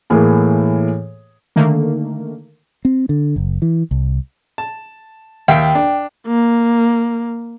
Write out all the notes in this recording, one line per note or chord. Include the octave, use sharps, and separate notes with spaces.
A2 E3 A#3 G#4
D3 D#3 A3 A#3
C4
D3
F#1
E3
C2
A5
D#2 E5 F5 G5
D4
A#3